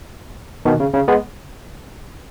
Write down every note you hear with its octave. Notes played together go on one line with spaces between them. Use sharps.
B2 D#3
C#3
C#3
G#3 B3